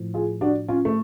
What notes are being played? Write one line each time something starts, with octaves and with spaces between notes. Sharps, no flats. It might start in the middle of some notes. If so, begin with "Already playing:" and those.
Already playing: A2 F3
F4 G#4
D4 F#4
C#4 F4
A3